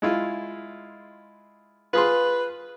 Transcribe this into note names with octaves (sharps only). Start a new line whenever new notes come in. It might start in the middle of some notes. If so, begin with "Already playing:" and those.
G#3 E4 F4
F4 G#4 B4 C6